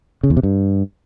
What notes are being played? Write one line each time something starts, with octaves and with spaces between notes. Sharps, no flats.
C#3
E2
C3
G2